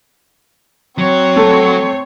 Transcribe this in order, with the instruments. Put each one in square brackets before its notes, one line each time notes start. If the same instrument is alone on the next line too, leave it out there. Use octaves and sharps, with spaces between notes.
[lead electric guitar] F#3 [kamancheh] C4 C#5
[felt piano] A3